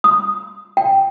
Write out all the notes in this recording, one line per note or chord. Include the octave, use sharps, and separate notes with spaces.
D#6
G5